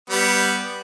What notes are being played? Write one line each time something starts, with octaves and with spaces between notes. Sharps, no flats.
G3 B3